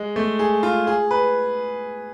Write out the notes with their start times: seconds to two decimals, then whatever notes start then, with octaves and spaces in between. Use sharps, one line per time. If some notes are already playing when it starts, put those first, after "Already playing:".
Already playing: G#3
0.16 A3
0.39 G#4
0.63 F4
0.87 G#4
1.11 B4